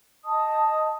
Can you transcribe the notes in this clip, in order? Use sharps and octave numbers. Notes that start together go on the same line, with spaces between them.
D#5 A5 D#6